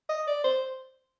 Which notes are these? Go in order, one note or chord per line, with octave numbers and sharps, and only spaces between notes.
D#5
D5
C5